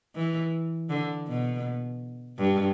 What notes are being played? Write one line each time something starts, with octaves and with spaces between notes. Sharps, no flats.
E3
D3
B2
G2